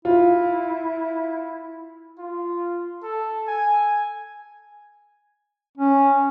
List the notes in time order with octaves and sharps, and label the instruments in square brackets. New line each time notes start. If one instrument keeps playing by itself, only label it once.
[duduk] E4 [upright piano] F4
[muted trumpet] F4
A4
G#5
[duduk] C#4